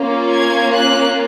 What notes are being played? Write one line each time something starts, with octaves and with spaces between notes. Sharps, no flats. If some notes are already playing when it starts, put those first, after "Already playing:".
Already playing: A#3 C#4 F4
G#6
F#6